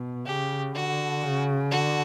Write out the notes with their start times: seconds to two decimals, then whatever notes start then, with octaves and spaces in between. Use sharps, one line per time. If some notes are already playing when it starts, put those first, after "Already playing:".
Already playing: B2
0.25 C#3 G4
0.74 D3 F#4
1.23 C#3
1.71 D3 F#4